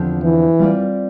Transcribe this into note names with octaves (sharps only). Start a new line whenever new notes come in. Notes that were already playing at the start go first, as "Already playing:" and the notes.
Already playing: E2 D3 F3 C4 G4
E3
G3 C4 F4 A#4 D5